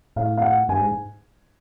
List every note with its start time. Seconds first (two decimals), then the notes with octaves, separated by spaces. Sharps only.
0.16 A2 F5
0.37 F5
0.42 F#5
0.69 G2 G#5
0.81 G#2